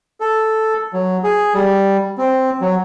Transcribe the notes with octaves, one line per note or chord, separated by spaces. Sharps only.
A4
F#3
G#4
G3
C4
F#3